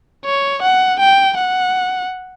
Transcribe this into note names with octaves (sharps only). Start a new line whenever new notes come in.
C#5
F#5
G5
F#5